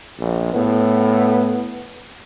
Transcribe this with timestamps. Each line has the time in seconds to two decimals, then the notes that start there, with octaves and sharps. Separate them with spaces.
0.19 A#1
0.54 A2 B3